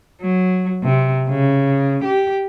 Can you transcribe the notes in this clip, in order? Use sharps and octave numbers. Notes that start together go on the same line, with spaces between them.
F#3
C3
C#3
G4